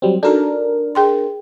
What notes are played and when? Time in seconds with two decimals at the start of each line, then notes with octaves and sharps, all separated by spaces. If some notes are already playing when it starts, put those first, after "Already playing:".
0.02 F#3 G3 C4
0.23 D4 D#4 F#4 A4 A#4
0.95 G#4 G5 C6